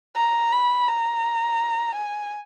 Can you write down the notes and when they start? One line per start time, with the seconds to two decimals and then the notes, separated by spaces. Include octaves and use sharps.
0.16 A#5
0.52 B5
0.88 A#5
1.95 G#5